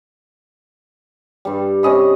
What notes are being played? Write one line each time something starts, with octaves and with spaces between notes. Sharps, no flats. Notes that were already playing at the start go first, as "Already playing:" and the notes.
G2 G3
C3 C#4 D#5 B5